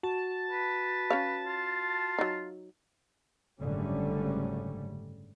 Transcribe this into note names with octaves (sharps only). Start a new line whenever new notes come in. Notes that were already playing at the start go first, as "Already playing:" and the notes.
F#4 A5
B4
C#4 C#5 F5
F4
F#3 D#4
F#1 G#2 D3 G3 A3 C#4